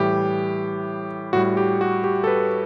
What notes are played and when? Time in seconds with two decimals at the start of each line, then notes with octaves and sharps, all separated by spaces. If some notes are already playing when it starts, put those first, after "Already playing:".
Already playing: A2 E3 G3 G4
1.33 A2 G3 F#4
1.57 G4
1.81 F#4
2.04 G4
2.24 A4
2.27 B4